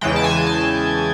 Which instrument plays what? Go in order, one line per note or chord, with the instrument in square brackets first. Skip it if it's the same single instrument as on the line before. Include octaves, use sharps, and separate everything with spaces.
[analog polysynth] E2 C#3 E3 G#3 G5
A5
G#5
A5